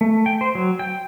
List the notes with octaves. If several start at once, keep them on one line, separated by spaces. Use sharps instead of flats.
A3
G5
C5
F#3
G5